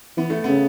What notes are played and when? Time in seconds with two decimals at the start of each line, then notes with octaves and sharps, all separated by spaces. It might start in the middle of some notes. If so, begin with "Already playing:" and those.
0.17 E3 B3
0.30 A3
0.44 C#3 B3